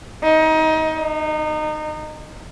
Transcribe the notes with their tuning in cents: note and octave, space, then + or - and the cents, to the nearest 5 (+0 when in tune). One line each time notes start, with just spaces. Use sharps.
D#4 +25
D#4 -25